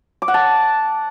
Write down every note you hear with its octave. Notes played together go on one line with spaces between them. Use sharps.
D6
F#5
A5